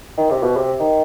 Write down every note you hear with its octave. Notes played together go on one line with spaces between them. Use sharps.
D#3
C3
B2
C3
D#3